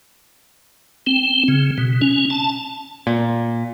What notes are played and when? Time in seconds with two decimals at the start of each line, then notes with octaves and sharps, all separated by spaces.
1.07 C4
1.48 C#3
1.78 B2
2.02 C#4
2.30 A5
3.07 A#2